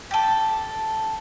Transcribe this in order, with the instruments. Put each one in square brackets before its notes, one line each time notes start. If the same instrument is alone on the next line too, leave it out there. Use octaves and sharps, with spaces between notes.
[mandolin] G4 A4